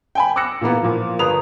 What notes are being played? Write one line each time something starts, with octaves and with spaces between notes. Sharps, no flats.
G5 G#5 B5
D6 E6 F#6 A#6 C#7
A#2 E3 A#3 B3
A#2 E3 F3
G1 A#4 B4 D#6 F7